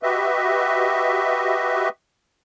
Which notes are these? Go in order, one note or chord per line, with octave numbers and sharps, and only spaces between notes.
F#4 G4 B4 D#5 E5